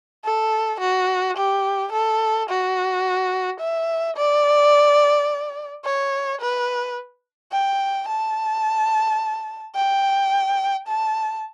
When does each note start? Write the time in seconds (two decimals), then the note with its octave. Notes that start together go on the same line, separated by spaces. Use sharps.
0.25 A4
0.80 F#4
1.37 G4
1.92 A4
2.49 F#4
3.60 E5
4.16 D5
5.85 C#5
6.41 B4
7.52 G5
8.08 A5
9.76 G5
10.87 A5